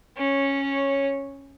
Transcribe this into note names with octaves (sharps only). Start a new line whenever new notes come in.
C#4 C#5